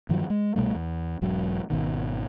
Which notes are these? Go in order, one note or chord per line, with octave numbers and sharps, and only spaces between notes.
G2 D#3 F3 F#3
G#3
C2 B2 G3 A3
E2
E1 G#2 F#3
G#1 B2 D#3